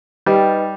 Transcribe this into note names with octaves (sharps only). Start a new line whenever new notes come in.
G3 D#4 B4 D#5 G5